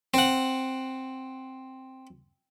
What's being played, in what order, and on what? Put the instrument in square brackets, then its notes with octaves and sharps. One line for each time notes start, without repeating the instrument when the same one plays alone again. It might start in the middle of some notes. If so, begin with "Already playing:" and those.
[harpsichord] C4 F#5